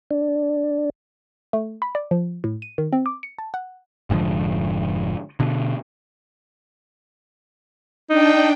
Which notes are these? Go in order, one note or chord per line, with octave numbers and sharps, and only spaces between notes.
D4
A3
B5
D5
F3
A2
D#7
D#3
C4
D6
C#7
A5
F#5
F1 G#2 D3 F3
B2 D3
D4 D#4 G5